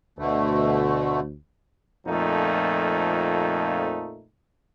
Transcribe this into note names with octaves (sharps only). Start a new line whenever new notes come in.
D2 B2 D3 A3
F2 A#2 F3 A3 D#4